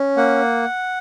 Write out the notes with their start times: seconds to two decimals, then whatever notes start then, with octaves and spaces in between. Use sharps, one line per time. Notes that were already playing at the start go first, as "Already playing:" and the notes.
Already playing: C#4
0.17 A#3 F#5